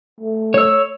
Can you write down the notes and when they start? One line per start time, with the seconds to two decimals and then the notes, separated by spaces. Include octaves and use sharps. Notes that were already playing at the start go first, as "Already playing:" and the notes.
0.20 A3
0.54 C#5 E6